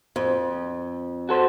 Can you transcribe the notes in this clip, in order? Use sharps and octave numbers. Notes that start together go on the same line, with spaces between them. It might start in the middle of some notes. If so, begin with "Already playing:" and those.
F2
F#4 A4 C5